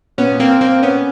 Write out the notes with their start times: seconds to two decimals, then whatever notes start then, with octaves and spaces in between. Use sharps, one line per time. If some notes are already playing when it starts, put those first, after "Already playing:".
0.18 A#2 B3 C#4
0.32 A#2
0.40 A#3 C4
0.47 A#2
0.61 A#2 A#3 C4
0.76 A#2
0.83 B3 C#4
0.90 A#2